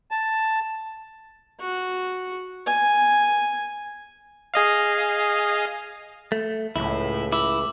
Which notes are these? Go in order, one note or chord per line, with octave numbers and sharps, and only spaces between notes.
A5
F#4
G#5
G#4 D#5 F5
A3
C#2 A2 E4
E4 D6 E6 F#7